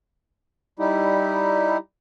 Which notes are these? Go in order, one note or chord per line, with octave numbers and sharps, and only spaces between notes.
G3 D#4 E4 G4